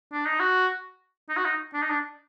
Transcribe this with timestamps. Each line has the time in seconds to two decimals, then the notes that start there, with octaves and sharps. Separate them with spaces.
0.13 D4
0.26 D#4
0.40 F#4
1.29 D#4
1.37 F#4
1.45 D#4
1.73 D4
1.82 D#4
1.89 D4